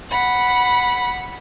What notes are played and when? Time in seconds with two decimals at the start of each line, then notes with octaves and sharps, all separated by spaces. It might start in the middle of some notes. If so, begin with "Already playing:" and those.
0.11 F#5 B5